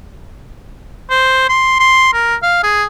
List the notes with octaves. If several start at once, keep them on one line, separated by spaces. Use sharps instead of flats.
C5
C6
C6
A#4
F5
G#4